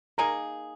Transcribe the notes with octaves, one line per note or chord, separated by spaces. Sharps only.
A#3 D#4 G#4 A#4 A#5